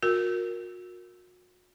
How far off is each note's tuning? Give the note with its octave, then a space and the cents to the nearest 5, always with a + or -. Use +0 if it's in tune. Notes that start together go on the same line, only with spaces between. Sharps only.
F#4 -40 A#4 +0